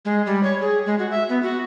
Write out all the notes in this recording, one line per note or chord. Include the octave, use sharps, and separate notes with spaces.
G#3
G3
C#5
G#4
G#3
F#4
E5
B3
F#4